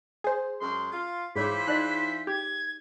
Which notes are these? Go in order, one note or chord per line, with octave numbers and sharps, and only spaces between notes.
G#4 C5
F#2 G#3 C6
F4
G#2 E3 F4 G#4 C5 C#5 D6 B6
D#4 D5 D#5 F#6
G4 G#6